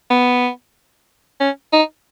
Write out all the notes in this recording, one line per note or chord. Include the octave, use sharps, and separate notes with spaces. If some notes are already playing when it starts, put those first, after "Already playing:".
B3
C#4
D#4